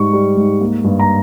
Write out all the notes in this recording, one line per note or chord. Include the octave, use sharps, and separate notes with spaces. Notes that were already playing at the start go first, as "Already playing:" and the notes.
Already playing: G#2 G3 C#6
G3
G#2
A#3
G2
A#5